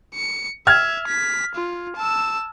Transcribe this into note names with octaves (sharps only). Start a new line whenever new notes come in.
C#7
E5 F6 G#6
B6
F4
A5 E6